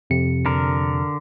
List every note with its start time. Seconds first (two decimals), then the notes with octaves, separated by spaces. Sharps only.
0.10 F2 C3 C#7
0.46 D3 A#4